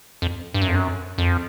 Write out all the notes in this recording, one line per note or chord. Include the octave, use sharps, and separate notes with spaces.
F2
G2
F#2
F2
F#2
F2